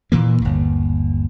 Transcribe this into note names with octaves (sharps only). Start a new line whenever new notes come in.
A#2 E3 A#3
G1 D#2